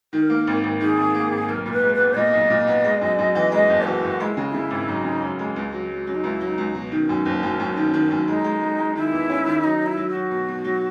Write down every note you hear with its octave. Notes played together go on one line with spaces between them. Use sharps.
D#3 A#4
A#3
G#1
G#1
D#3 G#4
G#1
A#3
G#1
B1 A#4
A#2 A#4
B4
G#3
B4
B3
A#2 D#5
B1
A#2
B3
G#3
F#2
F#2
E3
G#3 D#5
F#1
E3 F#4
F#1
G#3 E4
C#3 F#4
E4
C#3
G#1
F#2 D#4
C#3
F#2
G#3
C#2
F#3
F#3
F#3 C#4
D#4
C#2 E4
F#3
D#4
C#2
B2
D#3 C#4
F#2
F#1
F#2
F#2
D#3
D#3
F#2
G#3 D#4
G#3
G#3
G#3
D#3 E4
E2
C#4
D#3
F#3 D#4
F#3
E4
F#3
F#4
F#3
B2
B2
F#3